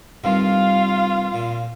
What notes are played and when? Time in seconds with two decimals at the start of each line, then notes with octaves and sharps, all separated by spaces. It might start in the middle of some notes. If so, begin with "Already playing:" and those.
0.24 C2 G2 D#3 F4 F5
1.34 A#2